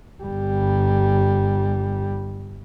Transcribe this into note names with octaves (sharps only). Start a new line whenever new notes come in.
G1 G3